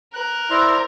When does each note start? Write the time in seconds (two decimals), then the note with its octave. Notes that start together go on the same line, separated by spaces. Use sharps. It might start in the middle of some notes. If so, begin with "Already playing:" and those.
0.14 A#4 F#6
0.50 E4 C5 D5 C6